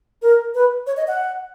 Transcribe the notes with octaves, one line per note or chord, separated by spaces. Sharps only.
A#4
B4
C#5
D#5
F#5